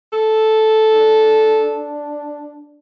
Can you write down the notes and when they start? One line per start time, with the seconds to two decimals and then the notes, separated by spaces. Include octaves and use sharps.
0.13 A4
0.93 D4